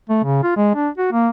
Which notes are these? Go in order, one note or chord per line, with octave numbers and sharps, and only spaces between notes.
A3
C#3
F4
G#3
D4
F#4
A#3